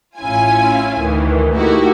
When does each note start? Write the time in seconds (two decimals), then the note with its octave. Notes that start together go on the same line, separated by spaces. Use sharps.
0.17 A1 C#4 E4 F4 G#5
0.98 D2 D#3 E3
1.54 A3 A#3 D#4 E4 F#4 G4